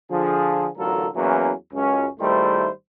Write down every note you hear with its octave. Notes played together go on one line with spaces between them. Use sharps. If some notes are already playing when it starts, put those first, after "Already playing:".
D3 F3 G#4
A1 D3 F#3 F4 A4 A#4
E2 E3 F#3 A#3 C#4
C#2 F#2 C#4
G#1 D#3 G3 A3 E4 C5